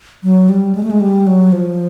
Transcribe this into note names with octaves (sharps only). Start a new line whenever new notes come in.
F#3
G3
G#3
A3
G#3
G3
F#3
F3